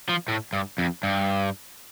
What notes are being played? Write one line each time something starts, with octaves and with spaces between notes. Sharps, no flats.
F3
A2
G2
F2
G2